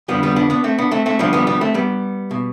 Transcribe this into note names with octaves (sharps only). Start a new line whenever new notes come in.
F2 D3 F3 G3 B3
G3 B3
B3 D4
B3 D4
A3 C4
B3 D4
A3 C4
A3 C4
D2 D3 F3 G3 B3
G3 B3
G3 B3
A3 C4
G3 B3
B2